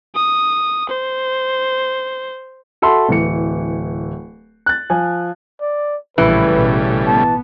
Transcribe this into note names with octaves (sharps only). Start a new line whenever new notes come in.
D#6
C5
F#4 A4 E5 B5 C6
D1 E3 C#7
F#6 A6
F3 G#5
D5
A#1 A2 C#3 E3 G3 B4
A1 B2
B3 A5